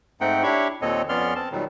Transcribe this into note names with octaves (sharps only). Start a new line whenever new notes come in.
G#2 A3 C4 D#4 F#5 G5
D4 E4 G4 C#5 B5 C#6
D#2 A#2 C4 A4 C#5 D#5
F2 B3 C#4 D5 C6 F6
C4 A5
A#2 D#3 F#3 G3